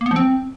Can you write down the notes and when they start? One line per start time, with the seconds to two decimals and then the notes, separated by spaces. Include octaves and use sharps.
0.01 A#3
0.06 B3
0.11 F3
0.16 C4